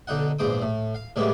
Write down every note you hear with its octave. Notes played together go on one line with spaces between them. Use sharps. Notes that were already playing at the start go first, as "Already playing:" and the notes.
B1 D3 D#4 F#5
A#1 E2 G#2 C5 D6 D#6
A2
F5
A2 C3 G3 G#3 A#3 B3